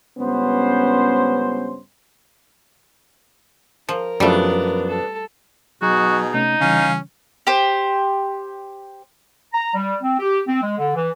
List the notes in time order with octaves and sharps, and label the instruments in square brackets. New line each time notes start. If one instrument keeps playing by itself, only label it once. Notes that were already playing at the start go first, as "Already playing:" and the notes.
[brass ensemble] C#2 G2 B3 C#4 C5
[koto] F3 [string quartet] A#4
[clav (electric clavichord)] F#2 F3 [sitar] B2 B3 D4 [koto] G3 A3
[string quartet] A4
[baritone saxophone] B2 [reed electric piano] F#3 [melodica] D#4 G#4 [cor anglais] F#4
[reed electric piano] C3 A3 C#4 [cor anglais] D#4
[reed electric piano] C#3 E3 G3 [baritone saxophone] C#4 [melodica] F5
[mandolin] G4 C5
[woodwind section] A#5
G3
C4
G4
C4
G#3
D3
E3